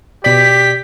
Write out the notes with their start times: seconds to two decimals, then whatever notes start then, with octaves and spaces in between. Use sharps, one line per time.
0.24 B2 G4 D5 B6